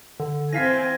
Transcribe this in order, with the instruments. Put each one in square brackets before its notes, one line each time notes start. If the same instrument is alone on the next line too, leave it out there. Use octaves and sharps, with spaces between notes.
[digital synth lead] D3
[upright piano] E3 F5 B6 [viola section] C4 G#5 [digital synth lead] A#6